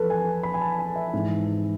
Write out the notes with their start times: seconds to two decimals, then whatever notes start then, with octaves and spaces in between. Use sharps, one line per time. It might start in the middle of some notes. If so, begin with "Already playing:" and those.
Already playing: F2 E3 A4 B4
0.10 G#5
0.43 B5
0.54 G#5
0.61 A5
0.79 G#5
0.95 E5
1.13 G#2 E3